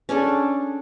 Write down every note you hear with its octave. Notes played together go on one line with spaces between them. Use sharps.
C#4 D4 G#4 A4